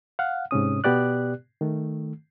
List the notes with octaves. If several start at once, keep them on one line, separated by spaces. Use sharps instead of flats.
F5 F#5
G#2 C3 C#4 D#6
B2 B3 G4 D5 F#6
D#3 A3